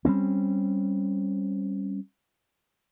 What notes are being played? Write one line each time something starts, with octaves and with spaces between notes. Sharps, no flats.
G3 A3 C4 C#4